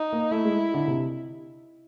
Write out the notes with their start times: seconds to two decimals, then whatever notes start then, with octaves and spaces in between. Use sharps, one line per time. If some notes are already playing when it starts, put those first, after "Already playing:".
Already playing: D#4
0.13 A#3
0.31 A3 E4
0.45 G#3
0.74 D3
0.88 C3